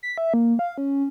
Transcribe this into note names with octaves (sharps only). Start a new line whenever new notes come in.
B6
E5
A#3
F5
C#4